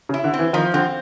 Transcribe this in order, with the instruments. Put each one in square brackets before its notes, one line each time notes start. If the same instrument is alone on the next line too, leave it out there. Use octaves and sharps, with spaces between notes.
[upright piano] C#3
[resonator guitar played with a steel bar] E4
[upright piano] D3
[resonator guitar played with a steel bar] C4
[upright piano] E3
[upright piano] D#3 [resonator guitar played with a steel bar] F3
[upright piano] D3 [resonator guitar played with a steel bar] C4